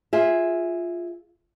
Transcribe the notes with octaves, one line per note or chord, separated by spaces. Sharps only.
F4 G#4 E5